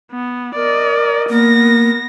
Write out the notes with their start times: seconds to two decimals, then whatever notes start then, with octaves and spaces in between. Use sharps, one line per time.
0.12 B3
0.55 A#4 D5 D#5
1.30 A#3 B3 A#6